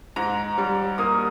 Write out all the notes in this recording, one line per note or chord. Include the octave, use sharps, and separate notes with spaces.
G#2 A#5
G3
A#3 D#6